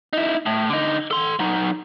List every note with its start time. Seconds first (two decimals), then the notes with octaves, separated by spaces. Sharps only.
0.13 D#4 E4
0.46 A2
0.70 D3 D#4
1.11 A4 C6
1.39 F#3 D#4